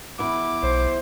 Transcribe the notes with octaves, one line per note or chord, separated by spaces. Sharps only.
E2 E4 D6
B1 C5